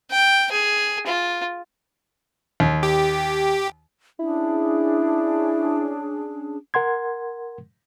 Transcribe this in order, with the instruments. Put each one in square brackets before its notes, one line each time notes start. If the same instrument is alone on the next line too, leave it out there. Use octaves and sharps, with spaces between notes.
[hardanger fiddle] G5
G#4
F4
[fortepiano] D#2
[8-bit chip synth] G4
[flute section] C#4 D4 G#4 [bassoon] E4
[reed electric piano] A#4 F#5 C6 G#6